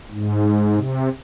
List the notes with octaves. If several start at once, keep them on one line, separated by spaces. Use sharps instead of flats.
G#2
C3